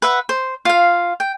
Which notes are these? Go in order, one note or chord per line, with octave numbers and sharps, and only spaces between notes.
B4 E5 F#5
C5
F4 F5
G5